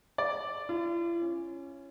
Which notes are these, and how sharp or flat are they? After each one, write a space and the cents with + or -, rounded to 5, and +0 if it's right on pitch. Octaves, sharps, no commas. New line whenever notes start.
D5 -5
F4 -45
C#4 -5